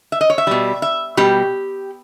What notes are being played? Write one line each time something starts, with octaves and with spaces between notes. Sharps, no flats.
E5
D#5
C#5
E5
B2 G3
E5
B2 G3 G4